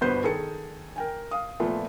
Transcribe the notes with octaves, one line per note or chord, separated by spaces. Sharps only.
G1 B2 B3 B4 C5 G6
D#3 G#4 A4 C#7
A#4 G5 G#5
F5 D#6
A#2 F3 A3 B3